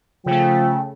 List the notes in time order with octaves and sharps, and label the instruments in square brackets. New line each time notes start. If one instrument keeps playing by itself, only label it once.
[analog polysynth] C#3 A3 [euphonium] F3 [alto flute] G5